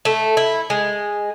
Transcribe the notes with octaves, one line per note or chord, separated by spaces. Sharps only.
A3
E4
G#3